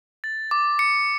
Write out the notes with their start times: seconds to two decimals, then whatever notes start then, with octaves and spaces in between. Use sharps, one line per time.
0.24 A6
0.51 D6
0.79 C#7